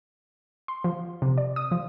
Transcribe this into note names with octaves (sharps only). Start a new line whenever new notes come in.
C6
F3
C3
D5
D#6
F3